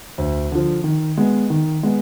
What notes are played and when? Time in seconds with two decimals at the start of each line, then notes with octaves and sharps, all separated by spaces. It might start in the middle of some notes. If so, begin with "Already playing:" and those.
0.18 D2
0.51 D3 F3
0.84 D#3
1.17 G#3 B3
1.50 D#3
1.83 G#3 B3